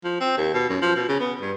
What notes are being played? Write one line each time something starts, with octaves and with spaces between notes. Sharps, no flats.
F3
C4
D#2
B2
F#2
F3
B2
C#3
B3
G2